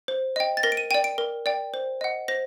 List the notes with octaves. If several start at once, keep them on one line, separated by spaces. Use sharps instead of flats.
C5
D#5 G5
A6
A#4 A#6
D7
D#7
D5 G5 D#7
D7
A#4
D5 G5
C5
D#5 F#5
C5 A#6